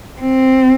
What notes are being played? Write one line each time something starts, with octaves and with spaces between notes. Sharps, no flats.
C4